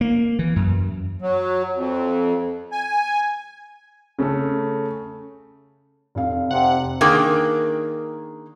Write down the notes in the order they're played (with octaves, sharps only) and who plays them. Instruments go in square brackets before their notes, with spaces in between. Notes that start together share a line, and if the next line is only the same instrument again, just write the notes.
[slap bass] A#3
E3
F#2
[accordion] F#3
F2
G#5
[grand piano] C#3 A3 A4
[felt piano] F1 F5
[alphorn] C3 [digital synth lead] F#5
[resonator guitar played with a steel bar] D#3 A#3 D4 G#4 A#4 G5